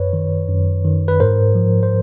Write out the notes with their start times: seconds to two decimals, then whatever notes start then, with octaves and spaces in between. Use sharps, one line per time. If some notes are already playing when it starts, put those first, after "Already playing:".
Already playing: F#2 B4 C#5
0.13 D#3
0.49 F#2
0.85 D#3
1.08 B4
1.20 G#2 A#4 C5
1.55 F3
1.83 C5